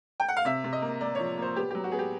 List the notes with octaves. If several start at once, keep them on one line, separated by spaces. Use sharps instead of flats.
G5
F#5
F5
C3 E5
C3
D#5
A#3
A#3 D5
F3 C#5
A#3 C5
B3 G4
F#3 G4
F#4
B3 G#4
G4